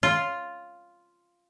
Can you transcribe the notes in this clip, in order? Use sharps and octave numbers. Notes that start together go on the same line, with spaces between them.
F4